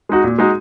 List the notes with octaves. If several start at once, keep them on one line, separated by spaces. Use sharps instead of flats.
G#3 D#4 F#4
A#2
G#3 D#4 F#4